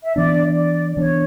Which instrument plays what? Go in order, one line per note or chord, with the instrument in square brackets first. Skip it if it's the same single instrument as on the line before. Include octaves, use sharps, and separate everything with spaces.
[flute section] E5
[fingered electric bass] E3 B3 D4 [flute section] D5
[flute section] D5
[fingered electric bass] E3 B3 D4 [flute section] C#5